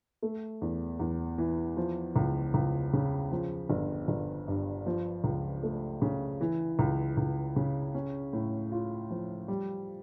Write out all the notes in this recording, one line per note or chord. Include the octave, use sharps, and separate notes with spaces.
A3
E2
E2
E3
F3
C#2
C#2
C#3
F3
G1
G1
G2
F3
C#2
A3
C#3
E3
C#2
C#2
C#3
C#4
A2
F4
F3
G3